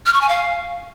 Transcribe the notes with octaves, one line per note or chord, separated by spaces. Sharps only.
F6
C#6
G#5
F5